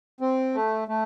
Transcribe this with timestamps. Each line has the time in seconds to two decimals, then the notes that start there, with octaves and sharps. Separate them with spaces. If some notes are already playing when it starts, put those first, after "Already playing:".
0.21 C4
0.54 A3
0.88 A3